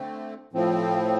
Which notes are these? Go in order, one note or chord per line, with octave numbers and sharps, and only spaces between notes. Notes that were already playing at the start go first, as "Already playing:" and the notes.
Already playing: D3 A3 C4
A2 F3 C4